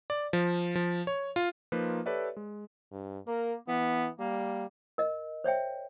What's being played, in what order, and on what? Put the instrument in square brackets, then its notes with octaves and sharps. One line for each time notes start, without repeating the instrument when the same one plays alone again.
[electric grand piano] D5
F3
F3
C#5
F4
F3 A#3 D#4 F4 B4
G4 A4 B4 C#5 D5 E5
G#3
[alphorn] G2
[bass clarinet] A#3 [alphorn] A#4
[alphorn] E3 [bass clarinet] B3
[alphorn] G3 [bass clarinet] A#3
[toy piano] A#4 D#5
C5 C#5 E5 G5